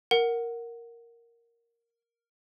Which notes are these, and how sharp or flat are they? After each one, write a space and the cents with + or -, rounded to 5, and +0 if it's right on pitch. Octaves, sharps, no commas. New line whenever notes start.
A#4 +0 F#5 +0